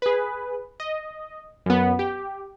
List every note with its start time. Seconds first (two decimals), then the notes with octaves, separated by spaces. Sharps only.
0.02 G#4 B4
0.80 D#5
1.66 F#2 B3
1.99 G4